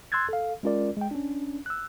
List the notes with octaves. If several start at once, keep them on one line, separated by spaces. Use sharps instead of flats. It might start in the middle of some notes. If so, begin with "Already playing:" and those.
C6 E6 F#6 G#6 A6
A4 F5
G#3 C#4 F4 A#4 D5
G#3 G5
C#4 D4
E6 F#6